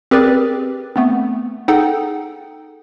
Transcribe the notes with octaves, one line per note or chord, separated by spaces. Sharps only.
C4 G4 G#4 A#4 B4 D5
A3 B3 C4
D#4 G#4 A4 F#5 G5